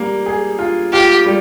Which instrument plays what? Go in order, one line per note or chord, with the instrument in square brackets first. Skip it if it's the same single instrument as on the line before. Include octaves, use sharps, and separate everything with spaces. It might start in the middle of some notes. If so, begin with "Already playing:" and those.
Already playing: [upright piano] G3 A#3
G#4
F4
[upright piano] F4 [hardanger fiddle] G4
[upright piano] G3